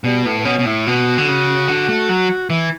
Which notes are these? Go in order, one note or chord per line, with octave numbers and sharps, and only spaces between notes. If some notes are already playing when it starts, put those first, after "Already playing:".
B2 G3
A2 B3
B3
B2 C#4
B2
A2 E4
B2 F#4
D3
C#3
D3
A3
F#3
E3 E4